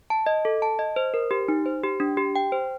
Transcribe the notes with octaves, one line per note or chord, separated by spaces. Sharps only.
A5
D#5
A4
A5
D#5
C5
A#4
G4
D#4
C5
G4
D4
G4
G5
C5